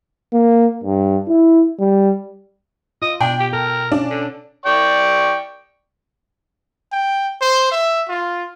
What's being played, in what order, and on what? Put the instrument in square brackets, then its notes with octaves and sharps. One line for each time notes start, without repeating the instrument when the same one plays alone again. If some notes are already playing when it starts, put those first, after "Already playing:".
[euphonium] A#3
G2
E4
G3
[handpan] F4 [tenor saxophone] D#5
[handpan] B2 [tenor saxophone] D4 [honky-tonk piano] G5
[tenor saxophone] G4
[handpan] A4 [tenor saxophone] A#4
[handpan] C#4 [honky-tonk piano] D4
[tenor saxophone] D3
[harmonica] D5 G5 C#6
[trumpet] G5
C5
E5
F4